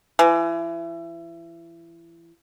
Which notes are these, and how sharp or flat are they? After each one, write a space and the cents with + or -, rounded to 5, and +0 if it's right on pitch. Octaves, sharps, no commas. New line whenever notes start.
E3 +30